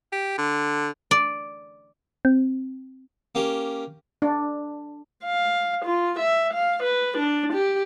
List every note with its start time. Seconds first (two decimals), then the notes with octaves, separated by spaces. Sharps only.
0.12 G4
0.38 D3
1.11 D5
2.25 C4
3.35 A#3 C#4 G4
4.22 D4
5.24 F5
5.85 F4
6.19 E5
6.54 F5
6.83 B4
7.17 D4
7.53 G4